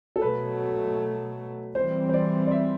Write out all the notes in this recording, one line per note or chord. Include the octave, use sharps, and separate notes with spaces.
A4
B2 F#3 A3 B4
E3 G3 C4 C5
C5
D5
D5
E5